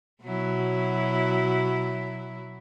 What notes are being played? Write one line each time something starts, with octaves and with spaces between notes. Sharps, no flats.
B2 F#3 E4